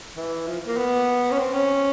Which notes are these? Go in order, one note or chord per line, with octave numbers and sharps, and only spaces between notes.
E3
F3
A#3
B3
C#4
C4
C#4